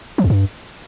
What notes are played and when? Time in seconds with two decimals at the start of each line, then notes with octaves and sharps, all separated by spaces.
0.18 F3
0.24 E2
0.30 G2